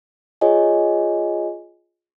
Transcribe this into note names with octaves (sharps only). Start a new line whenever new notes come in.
F4 G#4 C#5 D#5 G#5